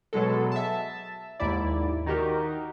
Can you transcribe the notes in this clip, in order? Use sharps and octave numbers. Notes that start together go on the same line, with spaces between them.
B2 F#3 G#3 A4
E5 A5
D#2 G#2 E4 D5
D#3 D#4 F#4 G4 A#4